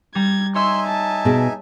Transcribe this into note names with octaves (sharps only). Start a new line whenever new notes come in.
G3 A#5 G#6
D#4 C#5 E5 G#5 C6 E6
A5
B2 G#4